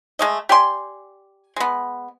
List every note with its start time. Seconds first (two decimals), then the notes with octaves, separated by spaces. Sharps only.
0.19 G#3 A3 D#5
0.49 G4 D5 G#5 C6
1.56 G#3 B3